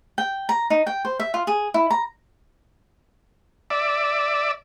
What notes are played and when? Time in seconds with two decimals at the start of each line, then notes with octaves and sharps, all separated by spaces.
0.18 G5
0.49 A#5
0.70 D#4
0.87 G5
1.05 C5
1.19 E5
1.34 F4
1.47 G#4
1.74 E4
1.91 A#5
3.70 D5 E5